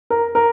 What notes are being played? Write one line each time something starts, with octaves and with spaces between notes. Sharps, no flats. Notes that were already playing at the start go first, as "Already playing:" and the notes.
A#4
A#4